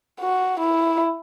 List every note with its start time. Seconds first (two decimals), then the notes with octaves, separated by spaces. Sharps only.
0.21 F#4
0.60 E4